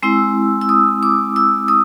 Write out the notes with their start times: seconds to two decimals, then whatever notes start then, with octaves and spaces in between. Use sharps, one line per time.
0.03 G#3 C4 E4 E6
0.61 E6
0.69 D#6
1.03 D6
1.36 E6
1.68 D#6